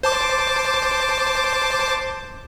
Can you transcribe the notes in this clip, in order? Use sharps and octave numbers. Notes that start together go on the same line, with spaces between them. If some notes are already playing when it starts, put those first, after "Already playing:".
C5 A5 D6